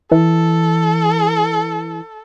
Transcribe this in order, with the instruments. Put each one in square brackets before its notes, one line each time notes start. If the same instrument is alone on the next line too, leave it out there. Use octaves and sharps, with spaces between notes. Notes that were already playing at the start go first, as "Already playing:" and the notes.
[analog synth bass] E3 [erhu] A4